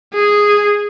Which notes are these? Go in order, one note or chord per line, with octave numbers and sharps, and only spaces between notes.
G#4